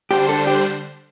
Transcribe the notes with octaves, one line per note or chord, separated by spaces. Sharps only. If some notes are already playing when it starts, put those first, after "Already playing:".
D3 G3 D4 G4 C5
A4
G4